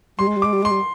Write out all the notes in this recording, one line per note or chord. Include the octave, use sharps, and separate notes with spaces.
G3 C6
G#3
G3
D6
G#3
G3
G#3 C6
G3